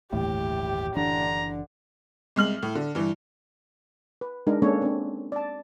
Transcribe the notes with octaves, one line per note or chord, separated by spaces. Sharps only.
G1 D#2 A2 E3 G4
F#1 D3 E3 D4 A#5
C2 G#3 F6 F#7
A2
D3
G2 E3
B4
G#3 D4 D#4 A#4
G#3 A#3 C#4 D4 A4 C#5
C4 D4
D5 A5